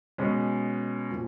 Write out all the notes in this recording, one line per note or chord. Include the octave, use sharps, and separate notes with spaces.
B2 G#3 C#4
A#2 F3